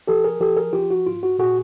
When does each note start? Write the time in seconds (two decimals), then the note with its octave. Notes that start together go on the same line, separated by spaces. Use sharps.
0.07 F3 G4 A4
0.24 G#4 A#4
0.40 F3 G4 A4
0.57 G#4 A#4
0.73 F3 F4 G4
0.91 F#4
1.06 G#2 F4
1.23 F#4
1.39 A#2 F#4 G#4